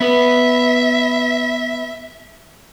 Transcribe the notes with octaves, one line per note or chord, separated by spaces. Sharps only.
B3 B4 E5